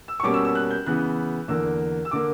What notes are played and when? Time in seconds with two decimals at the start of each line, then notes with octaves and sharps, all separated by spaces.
0.08 E6
0.20 C#6
0.23 B2 G3 A#3 C#4 D6
0.34 E6
0.45 E6
0.55 F#6
0.71 G6
0.86 C#3 E3 B3 F#6
1.48 E2 D3 A#3 E6
2.05 E6
2.11 D3 A#3 D6